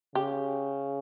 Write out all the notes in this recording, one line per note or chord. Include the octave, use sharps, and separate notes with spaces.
C#3 G4